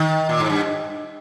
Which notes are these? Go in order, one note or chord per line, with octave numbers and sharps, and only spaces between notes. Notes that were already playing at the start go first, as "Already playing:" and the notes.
Already playing: D#3
A#2
G#2
G2